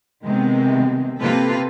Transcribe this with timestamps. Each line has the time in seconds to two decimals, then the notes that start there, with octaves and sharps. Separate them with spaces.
0.24 C3 D#3 G#3 B3 C4
1.20 C3 A#3 F4 A4 B4